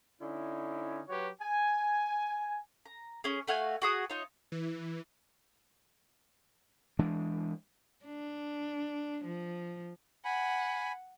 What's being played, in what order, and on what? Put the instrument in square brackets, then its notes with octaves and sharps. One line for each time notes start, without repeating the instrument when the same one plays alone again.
[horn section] D3 C#4 D#4 E4
F#3 F#4 G4 B4 C#5
G#5
[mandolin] A#5
C#4 G#4
A3 F#4 F5 G#5
F#4 G#4 D#6
D#4 F4 C#5
[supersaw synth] E3
[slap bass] E3 G#3 D4
[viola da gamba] D4
F3
[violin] F#5 [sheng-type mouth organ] G#5 B5